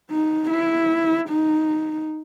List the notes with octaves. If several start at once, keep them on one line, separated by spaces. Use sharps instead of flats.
D#4
E4
D#4